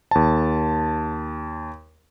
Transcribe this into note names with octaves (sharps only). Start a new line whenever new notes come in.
D#2 A5